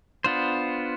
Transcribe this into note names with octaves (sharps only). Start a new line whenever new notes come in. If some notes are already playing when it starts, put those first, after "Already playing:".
B3 D4 F4 C5